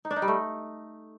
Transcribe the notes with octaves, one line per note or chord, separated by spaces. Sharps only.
D#4
D4
D#4
G3
A3